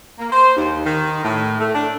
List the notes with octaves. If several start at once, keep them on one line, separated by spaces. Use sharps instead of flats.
A#3
C5
D#2
D#3
A2
A3
D4